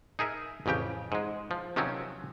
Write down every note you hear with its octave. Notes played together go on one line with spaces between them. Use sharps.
D#4 G#4 A#4 E5
A1 F2 C#3 G4 G5
G#2 G#3
F3
C3 D#3 F3 F#3 C4 C#4